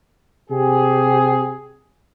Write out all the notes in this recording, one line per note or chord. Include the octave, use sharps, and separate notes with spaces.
C3 G4 G#4